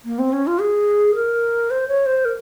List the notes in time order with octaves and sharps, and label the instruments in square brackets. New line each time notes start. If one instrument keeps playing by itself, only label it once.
[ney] A#3
C4
C#4
F4
G#4
A#4
C5
C#5
C5
A#4